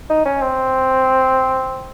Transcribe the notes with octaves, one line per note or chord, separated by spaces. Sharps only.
D#4
C#4
C4